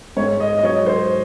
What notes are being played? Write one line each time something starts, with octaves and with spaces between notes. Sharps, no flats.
G#2 C#5
D#5
D#5
F#3 C#5
C5